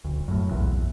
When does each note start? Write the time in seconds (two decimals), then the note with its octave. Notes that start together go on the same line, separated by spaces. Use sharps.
0.05 D#1 D2
0.28 F#2 A2
0.50 B1 E2 A#2 E3